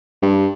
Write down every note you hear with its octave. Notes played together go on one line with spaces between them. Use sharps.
G2